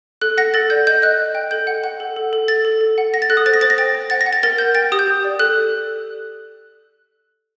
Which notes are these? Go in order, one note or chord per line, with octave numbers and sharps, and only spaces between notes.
A4 F#6
F#5 A#6
A4 A6
D5 G6
D#5 G6
D#5 F#6
D#5
G5
A4 G6
F#5
F#5
A4
A4
A4
A4 A6
A4
A4
F#5
F#5 A#6
A6
A4 F#6
D#6
C5 A6
A#6
C5 A6
A#6
G5 A6
C5
F#5 A6
A#6
F#5
A6
A#4 A6
A#4 G6
G5 A6
G4 D#6
G6
G4
D5
A4 F#6